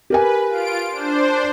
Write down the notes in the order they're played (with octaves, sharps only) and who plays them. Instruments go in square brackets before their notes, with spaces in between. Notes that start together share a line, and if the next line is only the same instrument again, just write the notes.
[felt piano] G4 A#4 G#5 [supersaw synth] B4
[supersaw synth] F4 D7
D4 C5